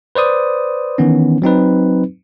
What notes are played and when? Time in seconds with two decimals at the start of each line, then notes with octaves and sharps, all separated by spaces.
0.15 B4 C5 D5 D#6
0.98 D#3 E3 B3 C#4
1.42 F#3 C4 D#4 B4